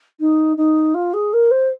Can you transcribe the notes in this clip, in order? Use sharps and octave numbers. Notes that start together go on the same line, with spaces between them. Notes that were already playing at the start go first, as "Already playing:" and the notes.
D#4
D#4
F4
G#4
A#4
C5